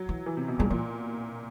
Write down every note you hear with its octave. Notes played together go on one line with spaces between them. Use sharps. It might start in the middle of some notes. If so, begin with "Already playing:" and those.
Already playing: F#3
E3
E3
C3
B2
A#2 G#3
A#2 E3